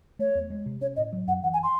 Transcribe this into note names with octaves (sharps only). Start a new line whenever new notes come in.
A3 C#5
E2
G#3
C3
C#4 C#5
A2 D#5
F#3
F#2 F#5
E3 F#5
G#5
C6